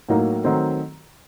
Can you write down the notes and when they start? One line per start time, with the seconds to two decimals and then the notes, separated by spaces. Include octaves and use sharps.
0.09 A2 F#3 A#3 D#4 A#4
0.44 D#3 F#3 A3 C4